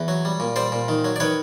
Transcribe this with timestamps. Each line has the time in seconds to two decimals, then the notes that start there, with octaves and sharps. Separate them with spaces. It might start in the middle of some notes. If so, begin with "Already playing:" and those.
Already playing: E2 B4
0.08 F#3
0.25 G3
0.40 A#2
0.56 G3 C5 D5
0.72 A#2
0.89 D#3
1.05 F#3
1.16 D5
1.20 D#3 B4 C#5